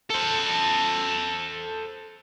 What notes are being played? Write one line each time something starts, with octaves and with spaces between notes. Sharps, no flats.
A4 C5